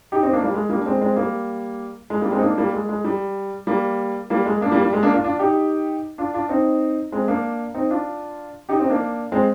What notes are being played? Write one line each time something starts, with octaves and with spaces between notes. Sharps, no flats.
D#4 G4
C4 D#4
A#3 D4
G3 A#3
G#3
G3 A#3
D4
G#3 C4
G#3 C4
G3 A#3
G#3
G3 A#3
G#3 C4
D#4
A#3 D4
G3 A#3
G#3
G#3
G3
G3 A#3
G3 A#3
G#3
A#3 D4
G3 A#3
G3
G#3
A#3 D4
D4 F4
D4 F4
D#4 G4
D4 F4
D4 F4
C4 D#4
G#3 C4
A#3 D4
C4 D#4
D4 F4
D#4 G4
C4 D#4
A#3 D4
G#3 C4